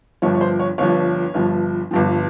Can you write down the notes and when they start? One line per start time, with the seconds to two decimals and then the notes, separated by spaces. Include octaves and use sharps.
0.22 G1 G2 F3 C#5
0.35 C#5
0.41 C5
0.59 C#5
0.78 G1 G2 F3 C#5
1.34 G1 G2 F3
1.91 G1 G2 F3